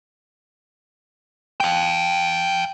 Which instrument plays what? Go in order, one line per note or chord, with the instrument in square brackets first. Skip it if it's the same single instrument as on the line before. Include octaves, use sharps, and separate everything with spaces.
[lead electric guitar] F5 G5